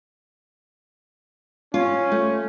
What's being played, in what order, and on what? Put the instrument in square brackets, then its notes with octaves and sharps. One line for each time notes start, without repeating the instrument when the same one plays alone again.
[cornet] C#4 [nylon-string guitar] F4
[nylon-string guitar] A3